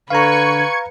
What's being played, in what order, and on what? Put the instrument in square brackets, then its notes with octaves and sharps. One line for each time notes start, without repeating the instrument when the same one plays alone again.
[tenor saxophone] D3 [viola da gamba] B4 [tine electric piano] F5 A#5 [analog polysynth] C#6 G#6 C#7